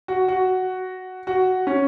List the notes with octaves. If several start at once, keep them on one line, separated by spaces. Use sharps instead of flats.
F#4
F#4
F#4
C#4